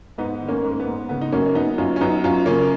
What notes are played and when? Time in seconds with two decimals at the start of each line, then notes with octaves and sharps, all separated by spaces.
0.18 G#2 B3 D#4
0.41 D#3
0.48 A#3 C#4
0.64 G#2
0.72 A#3
0.80 B3
0.87 G#2
1.09 C#3 B3
1.21 D#4
1.32 F#2 A#3 C#4
1.55 F#2 B3 D#4
1.78 F#2 C#4 F4
1.96 C#4
2.01 F#2 B3 D#4
2.24 F#2 C#4 F4
2.46 C#3 A#3 C#4